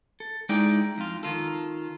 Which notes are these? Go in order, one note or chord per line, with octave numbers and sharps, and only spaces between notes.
A4
G#3 D#4 E4 D5 G5
F2 F4
D#3 F4 A4